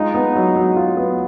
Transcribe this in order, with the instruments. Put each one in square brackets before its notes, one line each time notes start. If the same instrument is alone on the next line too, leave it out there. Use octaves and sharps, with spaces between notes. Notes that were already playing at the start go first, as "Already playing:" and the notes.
Already playing: [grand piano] G#3 F4 [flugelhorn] D#4
[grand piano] B3
F#3
F#3
F4
B3